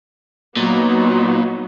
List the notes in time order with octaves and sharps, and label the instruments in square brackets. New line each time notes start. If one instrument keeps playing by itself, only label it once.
[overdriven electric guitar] A#2 [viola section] F#3 B3 D#4